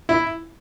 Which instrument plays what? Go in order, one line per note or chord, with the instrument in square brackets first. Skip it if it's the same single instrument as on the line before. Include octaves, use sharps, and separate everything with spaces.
[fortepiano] E4